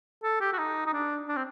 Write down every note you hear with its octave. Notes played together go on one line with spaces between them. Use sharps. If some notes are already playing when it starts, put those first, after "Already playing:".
A4
G4
F#4
D#4
D#4
D4
D4
C4